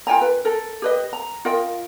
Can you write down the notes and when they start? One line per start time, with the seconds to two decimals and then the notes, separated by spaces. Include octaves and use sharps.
0.07 F4 G5 G#5 A#5
0.21 B4
0.45 A4 A#4
0.82 G4 B4 D#5
1.13 A#5
1.45 F4 A#4 D#5 G5